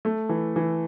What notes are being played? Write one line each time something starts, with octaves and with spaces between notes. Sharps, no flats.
A3
E3
E3